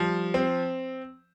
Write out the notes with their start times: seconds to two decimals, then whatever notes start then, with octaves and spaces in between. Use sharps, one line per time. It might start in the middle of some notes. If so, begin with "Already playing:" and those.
Already playing: F3 G3
0.34 C4